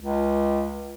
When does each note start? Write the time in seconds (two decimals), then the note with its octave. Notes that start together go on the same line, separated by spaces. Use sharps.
0.01 C#2